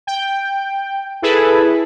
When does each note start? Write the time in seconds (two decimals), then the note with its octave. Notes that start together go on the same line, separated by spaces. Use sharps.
0.07 G5
1.22 E4 G#4 A4 B4